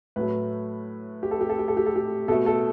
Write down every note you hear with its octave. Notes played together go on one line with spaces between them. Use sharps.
A2 F#3 A3 B4
G4
A4
G4
A4
G4
A4
G4
A4
G4
B2 A3 A4
A4